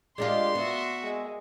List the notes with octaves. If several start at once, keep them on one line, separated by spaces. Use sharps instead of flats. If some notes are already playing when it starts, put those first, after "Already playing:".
G#3 D4 F4 G4 A#4 D5 C6
B3 F#4 E5
G#3